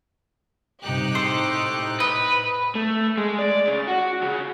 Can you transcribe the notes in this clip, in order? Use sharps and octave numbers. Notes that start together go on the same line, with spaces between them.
G2 C3 D#4 G4 F#6
A2 A4 C5 C#6
B4 D#5
A3
G#3
D5
C#3
F#4
C#3